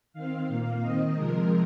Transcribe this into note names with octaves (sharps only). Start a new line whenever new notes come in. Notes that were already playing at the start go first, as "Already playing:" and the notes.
D#3 C4 F5
A#2 A#3 F5
D#3 C4 D#5
C3 F3 G#3 A#4